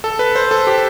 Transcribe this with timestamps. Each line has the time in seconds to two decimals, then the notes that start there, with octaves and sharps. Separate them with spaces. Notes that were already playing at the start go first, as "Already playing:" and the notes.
0.04 A4
0.19 B4
0.35 C5
0.51 A4
0.67 G4